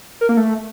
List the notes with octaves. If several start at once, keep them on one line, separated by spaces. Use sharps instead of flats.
A#4
A#3
A3